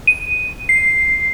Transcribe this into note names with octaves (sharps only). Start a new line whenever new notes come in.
D#7
C7